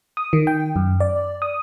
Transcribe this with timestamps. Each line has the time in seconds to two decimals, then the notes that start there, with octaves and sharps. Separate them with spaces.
0.17 D#6
0.33 D#3
0.47 G5
0.76 F#2
1.00 D5
1.42 D#6